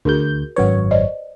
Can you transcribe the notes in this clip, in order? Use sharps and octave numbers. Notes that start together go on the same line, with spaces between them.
D2 F#4 G#4 A#4 G6
G#1 F#2 B4 C#5 F#5
C5 D5 D#5